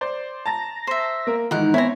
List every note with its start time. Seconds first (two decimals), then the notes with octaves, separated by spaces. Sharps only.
0.01 C5 D5
0.46 A5 A#5 A6 A#6
0.87 C5 E5
1.27 A#3 A#4
1.51 G#2 D#3 E3 D#4 A#4 F#5
1.74 B3 C4 E4 C#5 G#5 A#5